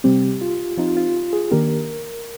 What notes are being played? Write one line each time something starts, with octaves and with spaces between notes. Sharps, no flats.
C3 G3 C4 G4
F4
F3 C4 D#4 F4
F4
G#4
D#3 A#3 D4 G4 A#4